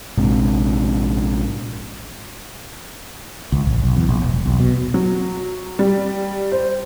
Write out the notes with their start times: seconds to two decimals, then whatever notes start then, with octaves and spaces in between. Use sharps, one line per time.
0.17 A#1 G#2 C3
3.52 C#2
3.65 A1
3.83 B1
3.97 E2
4.09 A#1
4.22 E1
4.46 B1
4.60 B2
4.94 F#3
5.79 G3
6.52 C5